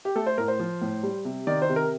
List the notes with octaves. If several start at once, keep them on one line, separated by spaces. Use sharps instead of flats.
G4
A3 A4
C5
A2 A#4
C5
F3
A2
G3
C3
D#3 D5
C5
C3
A#4